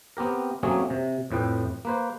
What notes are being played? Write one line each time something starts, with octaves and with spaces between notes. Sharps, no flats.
B3 C4 G4 A#4
F#3 A3 A#3 C4 C#4 G#4
C3
F2 A2 B4 G5
A#3 B4 C5